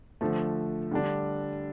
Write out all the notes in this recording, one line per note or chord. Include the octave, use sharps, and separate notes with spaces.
D3 F3 A3
D3 G3 D4